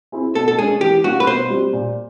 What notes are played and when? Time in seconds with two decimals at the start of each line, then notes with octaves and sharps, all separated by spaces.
0.12 C4 E4 G#4 C5
0.35 B2 A4
0.48 A4
0.58 G#3 C#4 G#4
0.81 E3 G4
1.04 G3 A#3 C#4 F4 F#4
1.20 B4
1.27 B2 C5
1.50 G3 C4
1.73 A#2